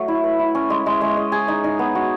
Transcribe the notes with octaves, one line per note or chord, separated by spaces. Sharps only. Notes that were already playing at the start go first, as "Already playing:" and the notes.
Already playing: F#3 A3
E4
B4
E4
C#4
G#3
G#3
G#3
D#5
G#4
D#4
D#4
B3
F#4